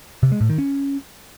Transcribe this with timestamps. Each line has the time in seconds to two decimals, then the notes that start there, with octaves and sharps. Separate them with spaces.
0.23 C3
0.32 G#3
0.41 A2
0.49 D#3
0.58 C#4